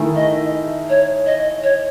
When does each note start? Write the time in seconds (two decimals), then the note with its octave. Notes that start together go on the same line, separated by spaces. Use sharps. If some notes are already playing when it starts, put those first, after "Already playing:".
Already playing: D#3 A3 E4 G#4
0.16 D#5
0.90 C#5
1.26 D#5
1.63 C#5